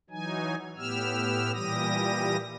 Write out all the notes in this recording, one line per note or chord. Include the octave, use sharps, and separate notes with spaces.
E3 F#3 D#4 G#5
A2 B3 G4 E6 F6
A#2 E3 G3 G4 D#6 A#6